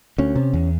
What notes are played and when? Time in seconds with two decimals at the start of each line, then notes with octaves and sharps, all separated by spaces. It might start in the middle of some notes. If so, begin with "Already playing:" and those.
0.18 D2 C#4
0.36 C3
0.53 E2